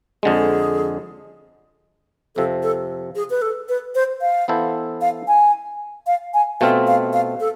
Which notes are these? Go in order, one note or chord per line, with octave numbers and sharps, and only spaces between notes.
F2 D3 G#3 G#4
F2 C3 F3 A4
A4
G#4
B4
A4
B4
C5
F5
E3 B3 E4 A4 C5
F5
G#5
F5
G#5
B2 A3 C4 F4 F5
F5
F5
A4